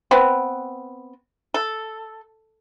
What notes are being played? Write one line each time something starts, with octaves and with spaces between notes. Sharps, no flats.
B3 C4
A4